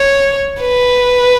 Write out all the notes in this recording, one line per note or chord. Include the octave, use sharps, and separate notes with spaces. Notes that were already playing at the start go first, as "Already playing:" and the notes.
Already playing: C#5
B4